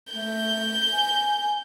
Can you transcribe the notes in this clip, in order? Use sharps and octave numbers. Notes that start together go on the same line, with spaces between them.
A3 G6
G#5